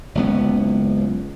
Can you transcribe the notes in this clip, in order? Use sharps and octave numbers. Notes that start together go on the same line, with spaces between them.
F#1 C#2 B3